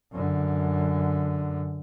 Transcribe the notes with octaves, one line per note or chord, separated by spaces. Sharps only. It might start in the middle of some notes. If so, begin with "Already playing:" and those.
F#2 D3